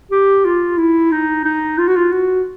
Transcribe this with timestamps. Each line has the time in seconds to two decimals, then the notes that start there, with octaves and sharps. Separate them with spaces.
0.11 G4
0.45 F4
0.78 E4
1.11 D#4
1.45 D#4
1.78 F4
1.87 F#4
1.96 F4
2.12 F#4